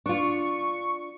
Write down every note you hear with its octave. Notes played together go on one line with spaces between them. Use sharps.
D4 F4 C#6